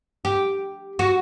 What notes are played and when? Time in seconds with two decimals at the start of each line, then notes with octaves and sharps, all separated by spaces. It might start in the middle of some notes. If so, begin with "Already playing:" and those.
0.25 G4
0.99 F#4